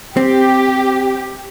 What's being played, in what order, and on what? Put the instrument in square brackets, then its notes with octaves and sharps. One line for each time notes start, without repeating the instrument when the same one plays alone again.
[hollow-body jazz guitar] C4 [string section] G4